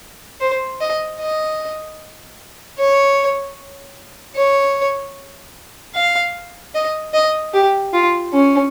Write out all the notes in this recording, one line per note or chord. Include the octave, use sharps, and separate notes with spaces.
C5
D#5
D#5
C#5
C#5
F5
D#5
D#5
G4
F4
C#4